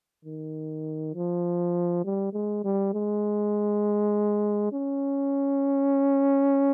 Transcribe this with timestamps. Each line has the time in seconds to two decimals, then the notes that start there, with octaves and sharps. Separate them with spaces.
0.25 D#3
1.15 F3
2.04 G3
2.33 G#3
2.64 G3
2.93 G#3
4.72 C#4